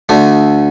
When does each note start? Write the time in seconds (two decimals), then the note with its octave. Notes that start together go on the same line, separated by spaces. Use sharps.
0.09 D2 D3 A3